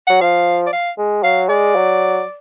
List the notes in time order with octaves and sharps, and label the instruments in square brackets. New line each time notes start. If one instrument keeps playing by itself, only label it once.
[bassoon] F#3 [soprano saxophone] F#5
[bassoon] F3 [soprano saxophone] F5
[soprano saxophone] D5
F5
[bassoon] G#3
[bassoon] F#3 [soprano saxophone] F5
[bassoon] G#3 [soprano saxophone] D5
[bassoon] F#3